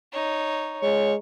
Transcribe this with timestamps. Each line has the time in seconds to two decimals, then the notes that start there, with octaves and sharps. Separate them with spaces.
0.12 D#4 C#5
0.82 G#3 C#5